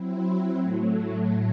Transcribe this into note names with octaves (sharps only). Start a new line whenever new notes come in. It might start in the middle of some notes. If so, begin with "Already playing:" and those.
Already playing: F#3 C4 E4
A2 F#3 A3